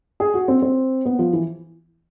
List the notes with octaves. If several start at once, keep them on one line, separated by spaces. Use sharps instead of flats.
G#4
F#4
C4
C4
B3
F3
E3